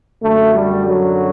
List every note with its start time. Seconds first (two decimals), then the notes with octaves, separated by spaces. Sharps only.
0.21 F#2 D3 A3
0.54 G3
0.85 F#3